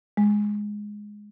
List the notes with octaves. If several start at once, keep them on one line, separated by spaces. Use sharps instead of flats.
G#3